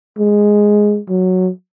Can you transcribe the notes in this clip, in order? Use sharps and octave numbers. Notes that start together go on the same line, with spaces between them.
G#3
F#3